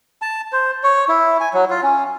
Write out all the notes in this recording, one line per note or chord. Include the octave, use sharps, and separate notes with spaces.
A5
C5
C#5
E4
G#5
F#3
F4
C#4